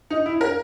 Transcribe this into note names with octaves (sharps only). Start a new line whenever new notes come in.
D#4
E4
A#4